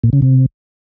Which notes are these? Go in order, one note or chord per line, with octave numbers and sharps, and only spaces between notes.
A#2
C#3
C3